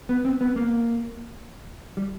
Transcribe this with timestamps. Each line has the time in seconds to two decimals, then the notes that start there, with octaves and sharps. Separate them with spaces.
0.09 B3
0.25 C4
0.41 B3
0.56 A#3
1.97 G3